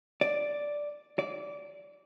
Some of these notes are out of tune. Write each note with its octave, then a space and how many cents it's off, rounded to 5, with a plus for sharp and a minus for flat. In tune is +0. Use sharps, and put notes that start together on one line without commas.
D5 +0
D5 -20